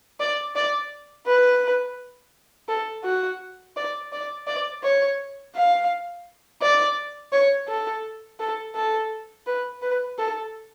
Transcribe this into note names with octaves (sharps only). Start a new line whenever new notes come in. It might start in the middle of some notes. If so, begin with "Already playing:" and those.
D5
D5
B4
A4
F#4
D5
D5
D5
C#5
F5
D5
C#5
A4
A4
A4
B4
B4
A4